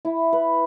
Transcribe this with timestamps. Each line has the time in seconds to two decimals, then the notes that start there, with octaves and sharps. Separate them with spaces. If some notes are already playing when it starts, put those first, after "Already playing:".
0.05 E4
0.33 B4